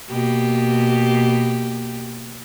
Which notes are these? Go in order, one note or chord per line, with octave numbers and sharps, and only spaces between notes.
B2 A#3 G4